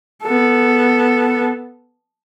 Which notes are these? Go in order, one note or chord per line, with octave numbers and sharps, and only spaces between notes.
B3 A4